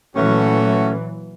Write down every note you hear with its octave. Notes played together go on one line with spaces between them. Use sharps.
A#2 E3 F#3 A3 C#4 F#4